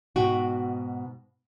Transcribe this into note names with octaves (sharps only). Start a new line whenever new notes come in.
G#2 B2 F#4 G5